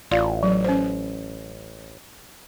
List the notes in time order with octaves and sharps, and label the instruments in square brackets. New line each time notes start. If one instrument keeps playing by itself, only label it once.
[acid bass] A1 [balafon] F4 D5 F5
[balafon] F#3
C#4 C5